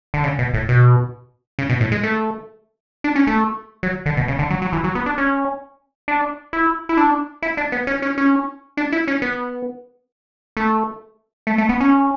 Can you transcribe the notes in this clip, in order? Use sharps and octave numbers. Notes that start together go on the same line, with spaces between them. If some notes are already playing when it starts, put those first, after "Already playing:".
D3
C#3
B2
A2
B2
C#3
B2
A2
G#3
A3
D4
C#4
A3
F#3
D3
B2
C#3
D3
F#3
F#3
E3
F#3
B3
D4
C#4
D4
E4
E4
D4
E4
D4
B3
C#4
C#4
C#4
D4
E4
C#4
B3
A3
A3
A3
B3
C#4